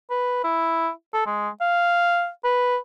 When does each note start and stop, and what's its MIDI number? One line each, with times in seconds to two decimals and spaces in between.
0.10 0.42 71
0.44 0.90 64
1.14 1.25 69
1.26 1.49 56
1.61 2.29 77
2.45 2.77 71